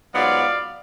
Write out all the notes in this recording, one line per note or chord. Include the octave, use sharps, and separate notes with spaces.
G#2 F#3 B3 F4 D5 F5